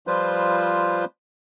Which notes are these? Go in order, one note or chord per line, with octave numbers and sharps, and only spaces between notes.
F3 G3 F4 B4 C5